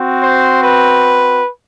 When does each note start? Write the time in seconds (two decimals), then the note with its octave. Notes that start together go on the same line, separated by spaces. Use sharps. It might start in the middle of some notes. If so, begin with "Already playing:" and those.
Already playing: C4 F#4
0.22 C5
0.62 B4